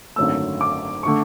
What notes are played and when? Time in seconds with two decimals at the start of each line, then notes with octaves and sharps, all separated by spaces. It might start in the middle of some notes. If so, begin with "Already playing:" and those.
0.16 G#1 F#2 D3 A3 E6
0.61 D6
1.03 D3 A3 C#6